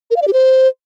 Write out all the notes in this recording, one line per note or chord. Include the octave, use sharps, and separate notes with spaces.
A#4
F5
D5
G4
C5